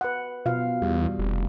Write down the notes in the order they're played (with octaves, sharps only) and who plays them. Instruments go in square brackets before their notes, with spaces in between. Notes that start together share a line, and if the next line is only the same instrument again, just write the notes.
[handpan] B4 F#5
B2 F4 F5
[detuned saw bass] E2 [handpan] G3
[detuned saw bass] F1